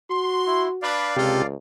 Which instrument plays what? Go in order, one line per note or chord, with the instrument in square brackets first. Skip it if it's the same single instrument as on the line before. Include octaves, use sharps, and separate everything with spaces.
[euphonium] F#4 [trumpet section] C6
[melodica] E4
[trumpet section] D4 B4 B5 [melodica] D5 F5
[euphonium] C#2 [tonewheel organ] C3 G4 [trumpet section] A#3 F4 A4